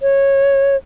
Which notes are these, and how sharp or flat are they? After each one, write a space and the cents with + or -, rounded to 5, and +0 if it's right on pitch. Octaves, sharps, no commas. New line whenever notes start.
C#5 -15